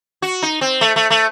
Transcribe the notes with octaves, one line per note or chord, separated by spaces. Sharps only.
F#4
D#4
C4
A3
A3
A3